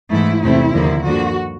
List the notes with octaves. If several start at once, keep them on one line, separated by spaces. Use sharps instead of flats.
G#2 E3 A3 E4
E2 C3 E3 A3 C4 E4
D#2 D3 F3 A#3
G2 D3 F3 A#3 F#4